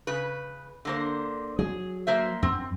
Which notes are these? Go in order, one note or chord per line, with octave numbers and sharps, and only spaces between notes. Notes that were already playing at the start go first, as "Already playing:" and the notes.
C#3 B4
D3 A#3 C5
F#3 G#4
A#3 C5 E5
F#2 C4